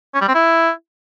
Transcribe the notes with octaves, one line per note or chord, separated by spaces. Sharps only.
C#4
G3
C4
E4